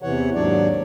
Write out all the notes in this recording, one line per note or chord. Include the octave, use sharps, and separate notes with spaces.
E2 C3 E3 C#5 F#5
D#2 G#2 F#3 D4 C#5 D5